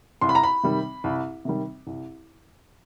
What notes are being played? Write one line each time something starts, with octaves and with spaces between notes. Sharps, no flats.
C2 C6
B5
A#5
B5
C3 D#3 G3
C2
C3 D#3 G3
C2